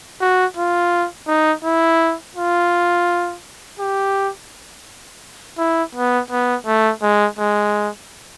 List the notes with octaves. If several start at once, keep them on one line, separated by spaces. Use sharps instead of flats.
F#4
F4
D#4
E4
F4
G4
E4
B3
B3
A3
G#3
G#3